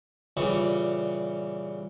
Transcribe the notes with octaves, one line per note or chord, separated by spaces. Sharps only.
A#2 C#3 E3 G3